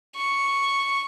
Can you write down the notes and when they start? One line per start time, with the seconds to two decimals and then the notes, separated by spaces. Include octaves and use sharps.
0.15 C#6